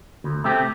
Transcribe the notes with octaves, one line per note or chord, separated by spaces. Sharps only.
D2
C3 A3 C4 G4